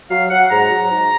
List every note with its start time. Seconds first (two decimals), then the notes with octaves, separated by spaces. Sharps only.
0.09 F#3 F5
0.30 F#3 F#5
0.50 G#2 A#5
0.70 F#3
0.91 G#2